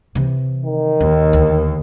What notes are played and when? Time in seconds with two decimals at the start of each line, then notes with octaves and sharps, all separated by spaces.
0.15 C3 E3
0.66 D#3
1.01 D#2 D#4
1.33 D2